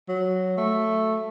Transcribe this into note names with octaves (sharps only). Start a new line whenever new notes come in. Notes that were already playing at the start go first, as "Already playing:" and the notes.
F#3
A3